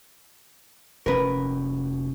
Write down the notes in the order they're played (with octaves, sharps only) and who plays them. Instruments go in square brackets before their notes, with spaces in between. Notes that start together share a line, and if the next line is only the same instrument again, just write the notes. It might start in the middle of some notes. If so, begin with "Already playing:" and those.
[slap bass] F1 C#4 [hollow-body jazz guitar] A#4 B4